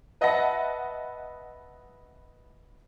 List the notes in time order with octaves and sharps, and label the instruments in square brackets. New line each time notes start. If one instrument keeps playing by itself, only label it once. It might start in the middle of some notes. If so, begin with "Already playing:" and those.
[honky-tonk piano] B4 D#5 E5 F#5 A5 A#6